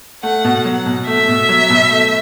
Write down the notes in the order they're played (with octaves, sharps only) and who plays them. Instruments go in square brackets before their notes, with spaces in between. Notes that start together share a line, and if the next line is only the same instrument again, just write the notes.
[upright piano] A3 [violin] F#5
[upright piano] B2
[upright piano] F#3 [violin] F#5
[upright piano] B2
[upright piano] A3 [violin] E5
[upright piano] B2
F#3
B2
A3